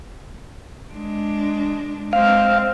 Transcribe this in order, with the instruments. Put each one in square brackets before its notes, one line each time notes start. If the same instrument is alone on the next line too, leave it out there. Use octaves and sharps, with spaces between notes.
[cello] G#3 D4
[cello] G#3 C4 [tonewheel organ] F5